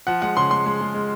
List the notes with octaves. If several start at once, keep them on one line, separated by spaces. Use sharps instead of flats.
F3 F#5
G#3 F#5
C#3 C6
G#3 C6
G#3
G#3
G#3